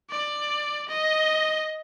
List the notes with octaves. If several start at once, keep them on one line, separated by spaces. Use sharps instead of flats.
D5
D#5